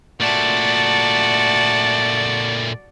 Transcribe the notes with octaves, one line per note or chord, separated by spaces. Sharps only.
A#2 A3 F#4 D5 A5